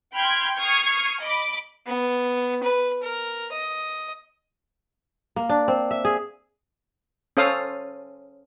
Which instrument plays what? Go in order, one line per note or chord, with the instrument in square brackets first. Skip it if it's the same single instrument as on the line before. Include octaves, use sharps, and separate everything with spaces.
[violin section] G5 B5 C6 F6 G6 G#6
C#6 D#6 F6 G#6 C7 C#7
D#5 B5 D6
[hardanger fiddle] B3
B4
A#4
D#5
[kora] A#3
D4
C4
E5
G#4
[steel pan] C#4 A4 C5 F5 D#6